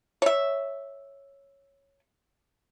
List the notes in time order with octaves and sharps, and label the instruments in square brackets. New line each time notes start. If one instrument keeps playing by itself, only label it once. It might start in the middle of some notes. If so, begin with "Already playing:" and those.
[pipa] C#5 E5